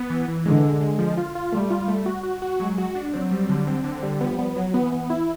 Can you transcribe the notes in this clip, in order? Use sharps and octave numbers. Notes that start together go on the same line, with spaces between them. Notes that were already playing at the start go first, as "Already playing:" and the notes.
Already playing: B3
E3
E3
D3 G#3
G#3
G#3
F3
F4
F4
G3 A3
F4
A3
F#4
F#4
F#4
F#3 G#3
F#4
D4
F#3 C4
G3
D3
C4
D3
G3
F3 B3
B3
F#3
E3 B3
B3
E4